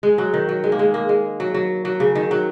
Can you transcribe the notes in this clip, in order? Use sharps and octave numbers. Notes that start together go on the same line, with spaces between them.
G#3
F#3
D#3
F#3
G#3
A#3
G#3
A#3
G#3
F#3
F#3
F#3
C#3
D#3
F#3